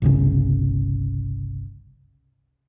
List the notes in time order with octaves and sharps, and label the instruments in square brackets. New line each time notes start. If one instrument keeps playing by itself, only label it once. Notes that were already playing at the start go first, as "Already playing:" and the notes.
[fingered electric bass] G1 C2 C#3